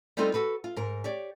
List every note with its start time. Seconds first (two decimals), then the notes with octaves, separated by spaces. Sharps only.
0.17 G3 B3 C4 D#4 F4 A4
0.34 F#4 A4 B4
0.64 F4
0.76 G#2 A#4
1.04 G4 C#5 D5